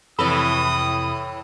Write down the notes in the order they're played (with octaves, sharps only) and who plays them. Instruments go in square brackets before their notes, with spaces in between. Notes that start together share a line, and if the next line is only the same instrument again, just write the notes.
[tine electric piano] F2 C3 E4 [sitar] A2 E3 A4 [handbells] B5 [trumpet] D#6